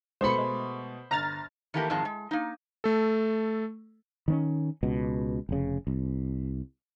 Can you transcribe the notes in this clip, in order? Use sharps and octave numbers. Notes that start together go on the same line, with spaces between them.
B2 G#3 A3 C5 B5 C#7
G#3
G1 A#5 F6 A6 A#6 F7
D#3 E3 A3 A#3 G4 A#4
F2 G#2 D#3 G#3 A5
G#3
A#3 D#4
A3 A4
D#3 C4 C#4
C#2 B2
F1 C#3
C2